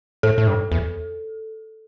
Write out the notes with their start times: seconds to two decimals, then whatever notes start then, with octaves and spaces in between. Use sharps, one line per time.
0.23 A2 A4
0.38 A2
0.47 G2
0.72 E2